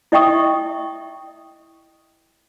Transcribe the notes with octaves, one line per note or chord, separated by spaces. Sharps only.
E4 D#5 E5 G5 C#6 D#6